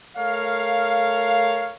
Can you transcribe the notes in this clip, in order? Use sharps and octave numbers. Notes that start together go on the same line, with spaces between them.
A3 A#4 C#5 F5